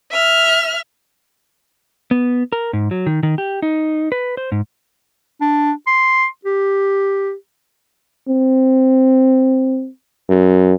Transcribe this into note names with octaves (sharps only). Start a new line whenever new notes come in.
E5 F6
B3
A#4
G#2
F#3
D#3
D#3
G4
D#4
B4
C5
G#2
D4
C6
G4
C4
F#2